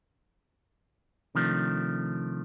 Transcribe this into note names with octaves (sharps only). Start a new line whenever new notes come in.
C3 D#3 F3 A3 D4